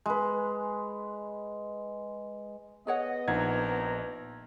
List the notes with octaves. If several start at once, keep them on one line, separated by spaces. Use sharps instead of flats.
G#3 B4
B3 G#4 C#5 D#5 F#5
A#1 C4 D#4 A#4 F#5 A#5 G#6